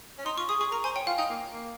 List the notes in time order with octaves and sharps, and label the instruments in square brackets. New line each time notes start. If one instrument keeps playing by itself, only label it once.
[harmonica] C#4
[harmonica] D#4 [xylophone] C6
[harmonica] F4 [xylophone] C#6
[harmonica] G#4 [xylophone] D#6
[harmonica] G#4 [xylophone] C#6
[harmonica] A#4 [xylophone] A#5
[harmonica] C5 [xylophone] G#5
[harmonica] C#5 [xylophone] G5
[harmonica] F4 [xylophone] F5
[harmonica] D#4 [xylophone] G5
[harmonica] A#3
A#3